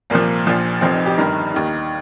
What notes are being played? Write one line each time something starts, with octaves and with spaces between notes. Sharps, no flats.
C2 A#2 F3 A#3
A#1 A#2 F3
F1 F2 F3 C4
D#4
G4
G1 G2 D#3 A#4
D#2 D#3